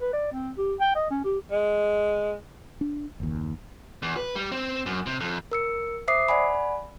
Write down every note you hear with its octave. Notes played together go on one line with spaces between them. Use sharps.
B4
D5
C4
G4
G5
D#5
C#4
G4
G#3
D4
F#1 D#2
E2
B4
G3
C4
F#2
C3
F2
A#4 E6 C#7
C5 E5 D6 D#6 C7
D5 F#5 G#5 B5